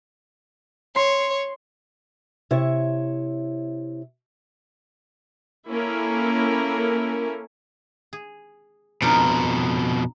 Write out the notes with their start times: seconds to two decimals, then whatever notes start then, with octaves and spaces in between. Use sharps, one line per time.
0.96 C#5 C6
2.51 C3 E4 C#5
5.67 A#3 C#4 E4 A4 A#4
8.13 G#4
9.02 F2 B2 D4 D#4 F4